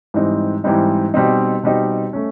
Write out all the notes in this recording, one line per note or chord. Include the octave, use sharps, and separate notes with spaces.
G#2 E3 G3 C4 D#4
G#2 E3 G3 C4 D#4
B2 G3 C4 D#4
B2 G3 C4 D#4
A3 C#4